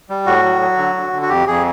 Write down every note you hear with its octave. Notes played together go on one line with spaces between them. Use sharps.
G3
A2 F#4
F#3
F#3
D3
D3
D3
F#4
F2 G4
F2 G#4